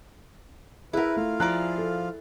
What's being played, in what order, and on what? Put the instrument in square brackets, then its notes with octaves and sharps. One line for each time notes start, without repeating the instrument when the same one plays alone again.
[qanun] E4 A#4 [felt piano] G#4 E5 [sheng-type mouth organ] B4
[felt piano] A3 [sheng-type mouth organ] F4 F5
[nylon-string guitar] F3 [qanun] E4 G#4 D5 [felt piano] A#5 F#6
[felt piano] A4